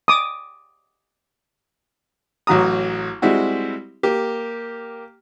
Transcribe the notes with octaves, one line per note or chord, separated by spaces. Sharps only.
D6 D#6
A1 F#3 F#4 A#5 D#6
G3 G#3 C4 E4 F#4
A#3 G4